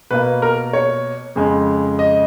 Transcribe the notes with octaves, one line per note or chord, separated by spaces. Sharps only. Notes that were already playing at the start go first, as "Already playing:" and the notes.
B2 A#3 B4
A#4
C#5
F2 C#3 G#3
D#5